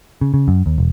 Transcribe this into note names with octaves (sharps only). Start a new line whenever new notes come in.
C#3
C#3
F#2
D#2
E1